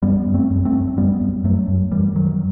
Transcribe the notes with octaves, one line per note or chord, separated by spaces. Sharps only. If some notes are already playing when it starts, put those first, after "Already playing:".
F#2 G3 B3
F#2
A3 C4
F#2
A3 C4
F#2
F#2 G3 B3
F#2
F#2 F#3 A3
F#2
F#2 E3 G3
F#2 D#3 F#3